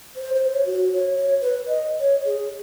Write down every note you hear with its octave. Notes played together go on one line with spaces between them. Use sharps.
C5
C5
C#5
F#4
C#5
C#5
B4
D#5
C#5
G#4